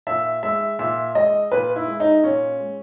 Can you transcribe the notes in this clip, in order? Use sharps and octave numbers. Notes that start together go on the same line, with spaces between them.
A#2 E5
G#3 E5
A#2 E5
G#3 D#5
A#2 B4
E4
G#3
D#4
A#2 C#4
G#3